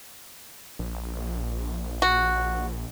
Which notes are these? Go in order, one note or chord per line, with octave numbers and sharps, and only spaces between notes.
A#1
F#4